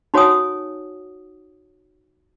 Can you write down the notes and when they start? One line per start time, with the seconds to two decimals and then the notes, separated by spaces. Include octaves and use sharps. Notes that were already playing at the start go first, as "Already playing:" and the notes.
0.14 D#4 F#4 C#5 F#5 G#5 D#6